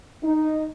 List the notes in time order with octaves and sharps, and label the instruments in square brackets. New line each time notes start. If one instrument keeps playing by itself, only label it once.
[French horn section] D#4